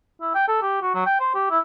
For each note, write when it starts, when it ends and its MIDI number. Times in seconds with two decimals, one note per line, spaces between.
0.21 0.32 64
0.35 0.47 79
0.48 0.60 69
0.62 0.81 67
0.82 0.94 66
0.94 1.05 54
1.06 1.17 79
1.20 1.30 72
1.34 1.49 67
1.50 1.59 64